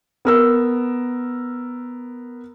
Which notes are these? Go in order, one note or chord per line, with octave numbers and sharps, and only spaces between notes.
B3 A#4 E6